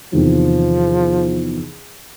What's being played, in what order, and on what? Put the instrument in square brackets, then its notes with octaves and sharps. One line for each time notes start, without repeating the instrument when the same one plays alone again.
[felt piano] E2 C3 D#3 [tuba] F3